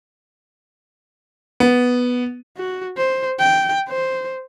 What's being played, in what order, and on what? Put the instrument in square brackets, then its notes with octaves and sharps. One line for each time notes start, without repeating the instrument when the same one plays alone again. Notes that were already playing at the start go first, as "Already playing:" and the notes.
[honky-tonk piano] B3
[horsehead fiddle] F#4
C5
G5
C5